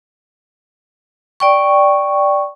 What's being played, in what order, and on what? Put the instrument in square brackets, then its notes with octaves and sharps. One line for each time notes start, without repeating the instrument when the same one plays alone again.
[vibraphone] D5 G5 C#6